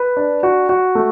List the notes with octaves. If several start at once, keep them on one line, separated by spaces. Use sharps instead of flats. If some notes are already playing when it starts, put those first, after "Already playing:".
Already playing: B4
D4
F#4
F#4
A3